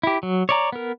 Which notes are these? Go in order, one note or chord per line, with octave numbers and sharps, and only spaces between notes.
E4 G4
F#3
C#5 D5 A#5
B3 A#4